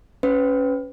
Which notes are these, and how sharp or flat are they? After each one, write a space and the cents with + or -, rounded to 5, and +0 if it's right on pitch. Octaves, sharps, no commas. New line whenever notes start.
C#4 +0 B4 +25